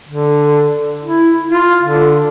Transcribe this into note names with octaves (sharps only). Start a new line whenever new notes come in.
D3
E4
F4
D3